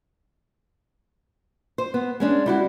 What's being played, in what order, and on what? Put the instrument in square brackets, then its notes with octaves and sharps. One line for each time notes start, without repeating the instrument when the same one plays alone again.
[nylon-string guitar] C5
B3
G#3 C#4 D4
G3 E4 F#4